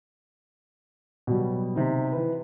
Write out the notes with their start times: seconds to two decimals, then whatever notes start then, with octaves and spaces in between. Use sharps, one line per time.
1.27 B2 F#3 G3
1.76 C3 D#4
2.12 E3 B4